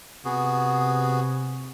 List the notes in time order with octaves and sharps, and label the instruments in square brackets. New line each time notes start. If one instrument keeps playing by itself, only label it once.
[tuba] C3 [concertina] B3 F#4 G#4